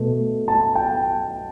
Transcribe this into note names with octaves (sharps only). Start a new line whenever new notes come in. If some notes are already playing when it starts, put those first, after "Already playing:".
Already playing: B2 A3
A5
G5